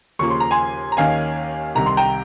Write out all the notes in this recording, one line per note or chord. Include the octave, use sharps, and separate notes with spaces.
D#2 C#3 F3 A#3 C#6
C6
A#5
G#5 C6
A#5
D#2 D#3 A#3 C#4 F5 G#5
C2 C3 D#3 A#5
C6
G5 A#5